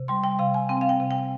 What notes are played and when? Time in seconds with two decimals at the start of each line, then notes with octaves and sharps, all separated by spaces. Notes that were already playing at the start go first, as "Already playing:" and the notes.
Already playing: C3
0.08 G3 C6
0.24 G5
0.39 C3 F5
0.54 G#5
0.69 C4 G5
0.81 F5
0.89 G5
1.00 C3
1.11 G5